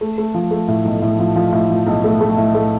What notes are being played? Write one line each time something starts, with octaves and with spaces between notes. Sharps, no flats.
A3
A3
F3
A3
A2
B1
A2
F3
F3
A2
F3
B1
A3
A3
A2
A3